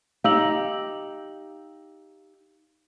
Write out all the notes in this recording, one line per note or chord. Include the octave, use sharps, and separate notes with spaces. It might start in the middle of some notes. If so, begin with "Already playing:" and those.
D#4 G4 F5 E6 F#7